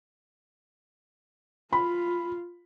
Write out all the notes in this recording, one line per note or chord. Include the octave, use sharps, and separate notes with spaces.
F4 B5